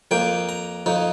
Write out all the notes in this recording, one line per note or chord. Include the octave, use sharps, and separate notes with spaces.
F2 F3 A#3 G5
A#5
F2 F3 D#4